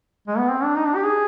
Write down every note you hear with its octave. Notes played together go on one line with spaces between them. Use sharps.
G#3
B3
C4
D4
D#4
D4
G4
G#4